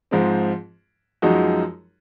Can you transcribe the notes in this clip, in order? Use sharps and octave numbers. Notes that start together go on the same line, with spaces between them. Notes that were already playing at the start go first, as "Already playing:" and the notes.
G#2 F3 G#3 C4
F#2 F3 G#3 D#4 F#4